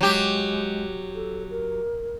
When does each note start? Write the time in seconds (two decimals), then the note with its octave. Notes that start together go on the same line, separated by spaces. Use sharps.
0.01 F#3 G#3 G4
1.14 A4
1.50 A#4